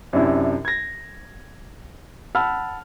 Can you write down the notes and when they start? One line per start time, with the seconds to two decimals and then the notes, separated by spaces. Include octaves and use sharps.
0.13 F#2 C3 C4 D4 E4
0.65 G#6 A#6
2.35 F#5 A5 B5 E6 F6